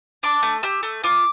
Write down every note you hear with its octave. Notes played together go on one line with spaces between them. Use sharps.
D4 D6
A3
G4 E6
A3
F4 D6